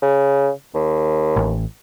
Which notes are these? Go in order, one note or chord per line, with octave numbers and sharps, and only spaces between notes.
C#3
D#2
A1